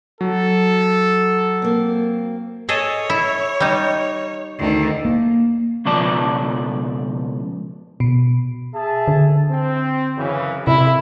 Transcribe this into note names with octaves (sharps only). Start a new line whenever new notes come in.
F#3 A4
A#3 C4
G#4 A4 C#5 D#5
E4
G3 D#4
D2 D#3
A#3
C#2 B2 F3 D5 A5
B2
G#4 E5 A5
D3
C4
F#2 C#3 E3
F2 C3 E4